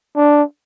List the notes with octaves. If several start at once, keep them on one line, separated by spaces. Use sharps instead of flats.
D4